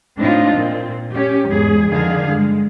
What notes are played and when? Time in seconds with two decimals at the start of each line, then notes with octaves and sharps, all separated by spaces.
0.18 A2 C4 D4 D#4 F4 D#5
0.53 A#2 C4
1.14 C#4 G4
1.46 E2 G#2 G#4
1.90 F2 D3 D#3 D4 G#4 F5
2.29 G2 G#3